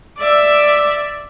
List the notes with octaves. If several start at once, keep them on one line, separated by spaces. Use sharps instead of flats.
D5 E5